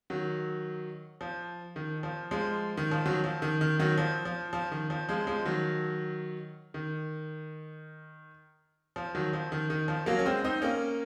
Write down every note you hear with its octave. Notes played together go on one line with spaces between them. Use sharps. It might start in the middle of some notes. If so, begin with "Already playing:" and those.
D#3 F#3
F3
D#3
F3
F3 G#3
D#3
F3
D#3 F#3
F3
D#3
D#3
D#3 F#3
F3
F3
F3
D#3
F3
F3 G#3
F3 G#3
D#3 F#3
D#3
F3
D#3 F#3
F3
D#3
D#3
F3
F#3 A#3
C#4
G#3 C4
C4 D#4
A#3 C#4